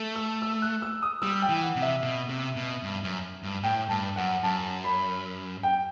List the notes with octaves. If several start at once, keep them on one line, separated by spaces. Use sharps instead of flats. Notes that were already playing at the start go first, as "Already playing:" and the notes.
Already playing: A3
E6
E6
F#6
E6
D#6
G3 E6
G5
E3
F#5
C3
E5
B2
C3
B2
G2
F#2
G2
A2 G5
G2 A5
F#2 F#5
F#2 A5
B5
G5